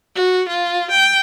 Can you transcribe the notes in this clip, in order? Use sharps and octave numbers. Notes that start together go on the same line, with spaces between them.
F#4
F4
G5